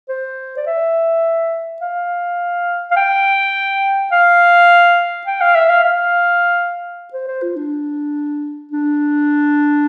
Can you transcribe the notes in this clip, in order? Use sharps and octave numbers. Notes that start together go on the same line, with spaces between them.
C5
D5
E5
F5
F5
G5
F5
G5
F5
E5
F5
F5
C5
C5
F4
D4
D4